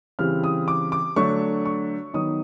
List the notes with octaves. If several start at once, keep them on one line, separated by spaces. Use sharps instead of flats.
C#3 E3 G3 C4 F6
D#6
D6
D6
D3 F#3 A3 D4 C#6
C#6
D#3 F#3 B3 D#4 D#6